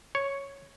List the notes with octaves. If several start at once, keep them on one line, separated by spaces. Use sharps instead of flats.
C#5